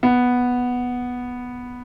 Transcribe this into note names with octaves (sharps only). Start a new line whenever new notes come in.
B3